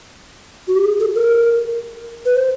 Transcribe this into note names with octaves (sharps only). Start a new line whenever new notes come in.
F#4
G4
G#4
A4
A#4
B4
C5